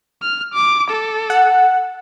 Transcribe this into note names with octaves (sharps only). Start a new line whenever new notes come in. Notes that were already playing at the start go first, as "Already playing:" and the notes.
F6
D6
A4
F#5